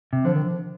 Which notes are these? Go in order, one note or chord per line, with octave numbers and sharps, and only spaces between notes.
C3
D3 F3
D#3
F3